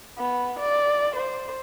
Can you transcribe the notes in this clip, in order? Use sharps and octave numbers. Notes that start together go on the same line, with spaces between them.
B3
D5
C5